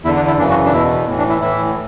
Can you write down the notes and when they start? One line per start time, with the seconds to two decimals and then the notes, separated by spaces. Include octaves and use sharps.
0.04 E2 D3 E4
0.16 D4
0.27 E4
0.38 F#2 C#3 E3 D4
0.50 F#4
0.65 D4
0.72 E2 B2 E4
1.06 A2 E3
1.18 D4
1.29 E4
1.41 A2 E3 E4